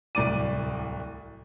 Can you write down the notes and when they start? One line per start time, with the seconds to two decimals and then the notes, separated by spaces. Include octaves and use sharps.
0.15 D1 C2 D5 D6 D#7